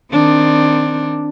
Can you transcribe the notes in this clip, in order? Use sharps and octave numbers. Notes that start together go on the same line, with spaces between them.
D#3 C4 D4